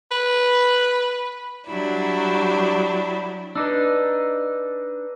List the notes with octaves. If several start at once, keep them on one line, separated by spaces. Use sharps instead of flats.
B4
F#3 G3 D4 E4
D4 D#4 B4 D6 E6